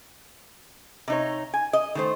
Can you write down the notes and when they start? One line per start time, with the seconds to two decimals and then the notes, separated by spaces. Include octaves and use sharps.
1.08 C3 D#4 C#5
1.54 G#5
1.73 D#5
1.95 D#3 A3 C5